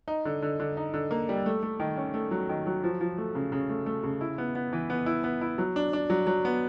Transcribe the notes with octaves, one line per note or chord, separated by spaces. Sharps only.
D#4
D3
D3
D3
D#4
D3
A#3
G3
A3
A3
D#3
C#4
A3
F#3
D#3
F#3
F3
F3
A3
C#3
C#3
A3
A3
C#3
E4
B3
B3
E3
B3
E4
B3
E4
F#3
D4
D4
F#3
F#3
B3